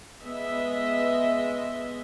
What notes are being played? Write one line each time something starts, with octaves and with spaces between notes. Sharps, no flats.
G#3 B3 D#5 E5